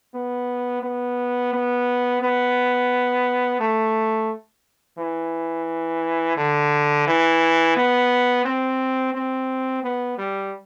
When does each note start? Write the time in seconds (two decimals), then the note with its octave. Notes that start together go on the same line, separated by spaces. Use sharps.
0.14 B3
0.83 B3
1.53 B3
2.22 B3
3.60 A3
4.98 E3
6.37 D3
7.07 E3
7.77 B3
8.45 C4
9.14 C4
9.84 B3
10.18 G3